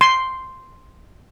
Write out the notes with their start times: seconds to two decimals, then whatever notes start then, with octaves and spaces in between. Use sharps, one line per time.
0.01 C6